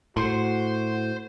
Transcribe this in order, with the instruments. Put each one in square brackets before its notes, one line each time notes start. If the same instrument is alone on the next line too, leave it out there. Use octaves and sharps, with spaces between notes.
[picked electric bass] A2 [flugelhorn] F#4 [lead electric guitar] C5 C6